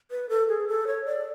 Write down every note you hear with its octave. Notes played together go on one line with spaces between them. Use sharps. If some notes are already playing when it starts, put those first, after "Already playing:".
B4
A4
G#4
A4
C#5
D5